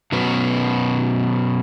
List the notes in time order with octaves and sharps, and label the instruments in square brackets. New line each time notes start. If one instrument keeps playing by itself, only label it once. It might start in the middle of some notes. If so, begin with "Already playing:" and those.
[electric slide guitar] B2 F#3 B3 C#4